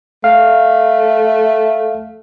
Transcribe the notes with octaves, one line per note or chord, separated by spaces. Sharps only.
A3 F5